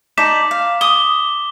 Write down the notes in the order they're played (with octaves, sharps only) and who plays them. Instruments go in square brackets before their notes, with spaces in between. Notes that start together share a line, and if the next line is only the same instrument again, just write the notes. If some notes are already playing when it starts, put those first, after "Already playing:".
[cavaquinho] D#4 D5 A5 [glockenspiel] D6 B6 E7
[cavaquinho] F5
[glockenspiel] D6 G7 [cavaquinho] D#6